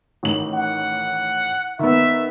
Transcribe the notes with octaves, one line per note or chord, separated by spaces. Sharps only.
A1 D#3 F#7
F#5
D#3 B3 E5